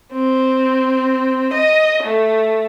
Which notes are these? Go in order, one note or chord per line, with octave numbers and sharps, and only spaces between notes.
C4
D#5
A3